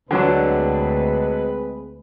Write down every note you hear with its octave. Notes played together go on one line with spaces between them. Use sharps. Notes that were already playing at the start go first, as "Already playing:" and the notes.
D2 D3 F#3 G#3 C4 D4 B4